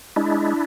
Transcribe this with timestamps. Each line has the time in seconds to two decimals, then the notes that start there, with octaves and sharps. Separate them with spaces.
0.16 G#3 D4 E4